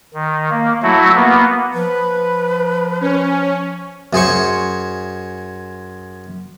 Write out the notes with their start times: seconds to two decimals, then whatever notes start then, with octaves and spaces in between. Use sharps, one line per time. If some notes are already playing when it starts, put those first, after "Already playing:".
0.14 D#3
0.51 A#3
0.82 F#3 A3 E4 F#4
1.15 A#3 B3
1.74 F3 B4
3.01 C#4
4.13 F#2 G#4 C5 C#6